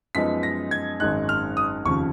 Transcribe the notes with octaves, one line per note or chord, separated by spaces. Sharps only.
F#2 F3 G#3 B3 D#4 B6
A#6
G#6
G#1 F#2 D#3 G#3 D#4 F#6
F6
D#6
F1 D#2 C#3 F3 C#6